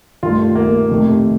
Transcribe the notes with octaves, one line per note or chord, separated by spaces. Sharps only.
G2 D#3 A3 F4
A#3
F2 C3 D#3 A3